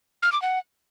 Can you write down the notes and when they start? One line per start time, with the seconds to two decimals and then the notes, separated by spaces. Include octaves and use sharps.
0.23 F6
0.32 D6
0.42 F#5